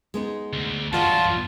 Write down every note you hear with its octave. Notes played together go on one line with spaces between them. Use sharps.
G#3 B3 D#4
D2
E2 G2 F#3 F4 D5 F#5 A5